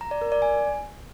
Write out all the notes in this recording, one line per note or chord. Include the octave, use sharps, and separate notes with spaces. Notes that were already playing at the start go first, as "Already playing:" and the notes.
A#5
D5
A#4
D5
G#5